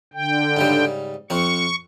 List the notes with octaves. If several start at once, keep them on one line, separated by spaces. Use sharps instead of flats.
D3 G5
G#2 C#3 G3
F2 C4 C#6